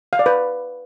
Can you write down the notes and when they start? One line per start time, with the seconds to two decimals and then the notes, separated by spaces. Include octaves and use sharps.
0.13 F5
0.19 D5
0.26 B4